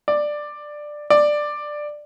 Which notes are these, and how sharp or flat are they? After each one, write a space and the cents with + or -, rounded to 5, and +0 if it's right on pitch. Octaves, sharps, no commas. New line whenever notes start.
D5 +10
D5 +10